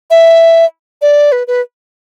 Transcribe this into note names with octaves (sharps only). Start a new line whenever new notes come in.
E5
D5
B4
B4